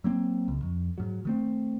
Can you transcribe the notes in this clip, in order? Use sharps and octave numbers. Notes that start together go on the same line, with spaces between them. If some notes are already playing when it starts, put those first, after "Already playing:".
F#3 A#3 C4
C#2
F2
G#2 F#3
D#3 A3 C4